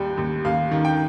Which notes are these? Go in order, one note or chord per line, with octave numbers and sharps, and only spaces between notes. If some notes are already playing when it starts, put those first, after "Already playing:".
Already playing: D#2 G3 G5
D#2
D#2 F5
D#3
G5